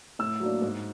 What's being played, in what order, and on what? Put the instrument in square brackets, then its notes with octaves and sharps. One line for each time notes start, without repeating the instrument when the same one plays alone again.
[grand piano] A2 E6
F#3 A#3 D4
G#2